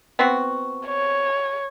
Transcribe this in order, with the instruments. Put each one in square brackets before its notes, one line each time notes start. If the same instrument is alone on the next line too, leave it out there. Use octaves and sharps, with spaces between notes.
[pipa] B3 C4 F#4
[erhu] C#5